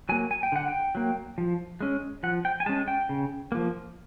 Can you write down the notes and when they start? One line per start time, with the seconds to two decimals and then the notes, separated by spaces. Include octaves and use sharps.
0.09 F#3 A#3 G#5
0.31 G#5
0.43 G5
0.52 D3 F#5
0.68 G5
0.95 F#3 A#3
1.38 F3
1.81 G#3 C#4
2.23 F3 F#5
2.45 G5
2.60 G#5
2.66 G#3 A5
2.69 C#4
2.88 G5
3.09 C#3
3.52 F3 A#3